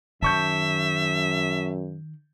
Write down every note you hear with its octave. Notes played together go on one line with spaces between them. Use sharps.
F#2 D#3 E5 A5 C#6 G6